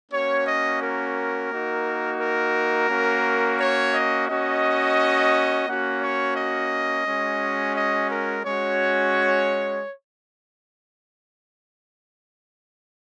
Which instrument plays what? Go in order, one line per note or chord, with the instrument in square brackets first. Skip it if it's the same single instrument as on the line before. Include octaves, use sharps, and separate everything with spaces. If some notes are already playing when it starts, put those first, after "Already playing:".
[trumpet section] A#3 C#4 F#4 C#5
D#5
A#4
A#3 D#4 F#4
A#4
A#3 C#4 F#4
C#5
D#5
A#3 C#4 F#4 D#5
A#3 C#4 F#4 F#5
C#5
D#5
G#3 C#4 F#4
D#5
A#4
G#3 C#4 F#4 C#5